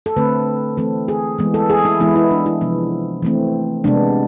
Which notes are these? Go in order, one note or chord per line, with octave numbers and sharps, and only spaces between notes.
A4
D3 A3 C4 B4
E3 A3 C4 A4
G#4
E3 G#3 B3
A4
G#4
E4
E3 G#3 B3 E4
E4
D4
E4
C3 F3 B3
E3 A3 C4
C3 G#3 B3 D4